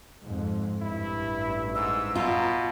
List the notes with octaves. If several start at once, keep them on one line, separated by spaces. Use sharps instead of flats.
F2 G#2
A1 G2 E4
G#2 E6
B2 F4 A#5